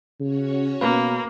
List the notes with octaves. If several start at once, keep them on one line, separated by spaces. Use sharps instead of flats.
C#3 C#4 F#4 C#5
B2 A#3 B4 F5 B5